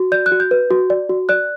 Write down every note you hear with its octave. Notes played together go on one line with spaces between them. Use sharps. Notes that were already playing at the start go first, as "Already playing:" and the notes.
Already playing: F#4
D5 G6
F#6
F#4
G6
B4
F#4
D5
F#4
D5 F#6